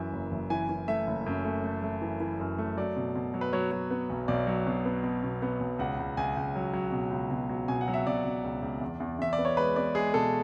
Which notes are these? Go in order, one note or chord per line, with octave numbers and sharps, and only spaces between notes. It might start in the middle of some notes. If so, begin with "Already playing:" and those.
Already playing: F#2 E3 E5
F#1
F#1
E3 G#5
E3
A3 E5
F#1
F#2
A3
A3
A3
E3
E3
F#2
A3
F#3 D5
B2
B2
F#3
B4
F#3 C#5
F#3
B3
B1
B1 D5
F#3
B2
B3
B2
B2
B3
B1
C#2 F#5
C#2
C#2 G#5
C#2
F#3
F#3
B2
C#2
B2
F#3
B2 G#5
F#5
F#3
E5
B2 D5
B2
C#2
C#2
E2
E2
E2 E5
D5
B3
C#5
G#3 B4
B3 D5
G#3 G#4
B2 A4